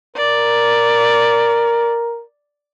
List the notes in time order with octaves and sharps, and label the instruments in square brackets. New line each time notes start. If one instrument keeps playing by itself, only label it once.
[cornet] A#4 [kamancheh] D5